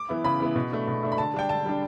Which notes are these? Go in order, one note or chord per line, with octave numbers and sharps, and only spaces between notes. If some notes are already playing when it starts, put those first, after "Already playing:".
Already playing: D6
E3 B3 E4
C#3 B5
E3 B3 E4
B2
A3 D4
B2
A3 D4
B5
D3 A5
G3 D4 G5
D3 A5
G3 D4